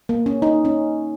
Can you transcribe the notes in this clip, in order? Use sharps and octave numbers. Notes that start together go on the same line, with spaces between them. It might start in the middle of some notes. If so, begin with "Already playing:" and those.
A#3
C#4
D#4
C#4